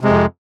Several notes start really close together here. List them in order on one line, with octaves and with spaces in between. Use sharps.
C3 G#3 F2